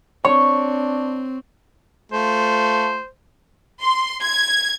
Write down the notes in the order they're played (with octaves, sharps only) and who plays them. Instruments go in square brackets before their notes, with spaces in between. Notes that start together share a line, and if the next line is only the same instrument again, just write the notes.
[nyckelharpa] C4 [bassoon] D4 [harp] C#5 [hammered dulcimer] C#6
[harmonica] A3 F4 [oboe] C5
[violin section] C6
G#6